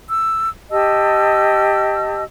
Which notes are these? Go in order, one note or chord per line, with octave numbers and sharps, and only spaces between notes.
E6
G4 D#5 A5 E6